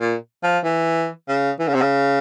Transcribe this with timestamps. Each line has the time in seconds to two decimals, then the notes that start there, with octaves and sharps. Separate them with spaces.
0.01 A#2
0.43 F3
0.64 E3
1.29 C#3
1.60 E3
1.68 C#3
1.74 C3
1.82 C#3